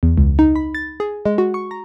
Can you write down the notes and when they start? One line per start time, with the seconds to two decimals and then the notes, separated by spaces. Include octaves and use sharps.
0.03 E2
0.18 C#2
0.39 D#4
0.56 B5
0.75 A6
1.00 G#4
1.25 G#3
1.38 F#4
1.54 C#6
1.71 A#5